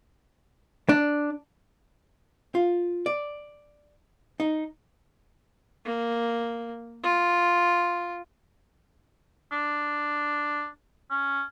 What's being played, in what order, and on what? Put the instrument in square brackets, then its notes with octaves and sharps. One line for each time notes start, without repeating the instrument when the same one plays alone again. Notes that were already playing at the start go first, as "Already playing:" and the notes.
[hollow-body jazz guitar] D4
F4
D5
D#4
[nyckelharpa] A#3
F4
[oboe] D4
C#4